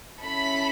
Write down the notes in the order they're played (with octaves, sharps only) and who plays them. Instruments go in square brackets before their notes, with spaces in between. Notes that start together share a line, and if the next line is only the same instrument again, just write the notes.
[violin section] C#4 E4 A4 B5